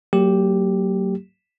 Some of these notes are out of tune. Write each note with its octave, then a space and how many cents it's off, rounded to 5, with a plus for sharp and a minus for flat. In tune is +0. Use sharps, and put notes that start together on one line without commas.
F#3 +20 A#3 -40 G4 +0